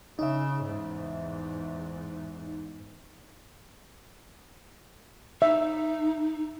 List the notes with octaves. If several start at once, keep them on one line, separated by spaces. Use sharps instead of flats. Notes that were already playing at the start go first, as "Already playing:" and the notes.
C#3 D#4 E5
E2 G#2
D#4 E5